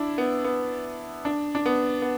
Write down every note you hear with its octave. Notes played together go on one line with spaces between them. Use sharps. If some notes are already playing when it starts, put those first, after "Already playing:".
Already playing: D4 E4
B3
B3
D4
D4
B3
B3